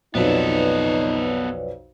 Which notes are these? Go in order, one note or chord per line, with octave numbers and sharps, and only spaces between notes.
B1 F2 B3 D#4 A4 B4 C#5 D5